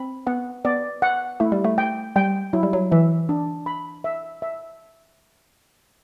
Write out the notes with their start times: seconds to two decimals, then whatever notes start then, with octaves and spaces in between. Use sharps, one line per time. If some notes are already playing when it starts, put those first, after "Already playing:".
Already playing: C4 B5
0.27 B3 F#5
0.65 B3 D5
1.02 F#5
1.40 A3 E4
1.52 G3
1.65 A3
1.78 G5
2.16 G3 G5
2.53 F#3 E4
2.63 G3
2.73 F#3
2.91 E3 E5
3.29 D4
3.66 B5
4.04 E5
4.42 E5